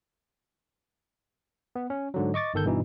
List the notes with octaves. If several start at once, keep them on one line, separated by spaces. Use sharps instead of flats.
B3
C#4
G#2 D3 F#3
D#5 C#6 D6 A6
G1 D#3 A4 G6
G2 B2 E3 D#4